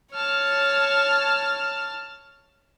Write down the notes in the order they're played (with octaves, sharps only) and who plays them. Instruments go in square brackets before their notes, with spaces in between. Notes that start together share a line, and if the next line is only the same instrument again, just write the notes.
[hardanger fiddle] C#5 [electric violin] A5 F6